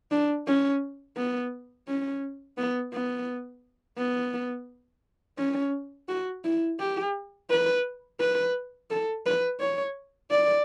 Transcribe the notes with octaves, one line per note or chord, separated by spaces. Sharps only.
D4
C#4
B3
C#4
B3
B3
B3
C#4
F#4
E4
G4
B4
B4
A4
B4
C#5
D5